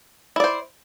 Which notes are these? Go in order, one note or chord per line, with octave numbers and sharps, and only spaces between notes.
E4 C5 D5